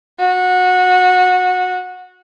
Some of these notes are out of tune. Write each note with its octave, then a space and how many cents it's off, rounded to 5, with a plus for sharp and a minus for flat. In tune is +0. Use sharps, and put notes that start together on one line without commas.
F#4 -20